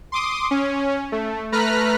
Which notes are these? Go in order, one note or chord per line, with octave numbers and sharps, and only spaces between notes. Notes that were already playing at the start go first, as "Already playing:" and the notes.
C6 D6 D#6
C#4
A3
A3 B4 A#5 F6 F#6 B6